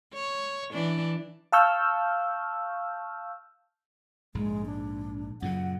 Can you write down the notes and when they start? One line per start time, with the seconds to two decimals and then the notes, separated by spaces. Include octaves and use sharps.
0.14 C#5
0.73 E3 D4
1.52 F5 A5 C#6 E6 F6 G6
4.35 A#1 G#2 G#3
4.66 D4
5.42 F#2 A#2 C#3 F#5